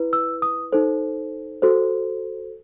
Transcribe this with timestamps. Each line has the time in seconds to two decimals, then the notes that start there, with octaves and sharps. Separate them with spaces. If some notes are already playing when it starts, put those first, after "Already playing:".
Already playing: E4 B4
0.13 E6
0.42 D#6
0.72 D#4 A4 C5
1.62 F#4 A4 C5